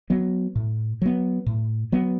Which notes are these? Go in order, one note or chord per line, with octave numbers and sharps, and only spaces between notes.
F#3 B3
A2
F#3 B3
A2
F#3 B3